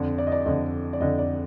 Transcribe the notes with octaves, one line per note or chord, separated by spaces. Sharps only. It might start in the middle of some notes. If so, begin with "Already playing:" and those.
Already playing: F2 D3
D5
D#5
D5
F2 D3 D#5
D5
F2 D3 D#5
D5